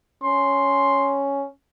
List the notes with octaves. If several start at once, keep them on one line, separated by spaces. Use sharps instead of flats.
C#4 C6